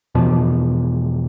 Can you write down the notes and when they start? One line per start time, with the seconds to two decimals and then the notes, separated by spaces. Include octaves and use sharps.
0.15 E2 B2 F3